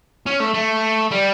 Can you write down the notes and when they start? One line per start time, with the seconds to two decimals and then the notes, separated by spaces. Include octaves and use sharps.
0.26 C#4
0.40 A3
0.54 A3
1.11 G3